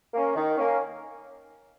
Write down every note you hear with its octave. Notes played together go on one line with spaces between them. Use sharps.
A#3 C#4
D#3
A#3 C#4